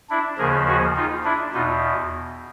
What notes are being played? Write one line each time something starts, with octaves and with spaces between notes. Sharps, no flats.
D4 E4
D#2 C#3 F3 G#4 A#4
F#4 G#4
D#4 F4
D4 E4
E2 B2 D#4 F4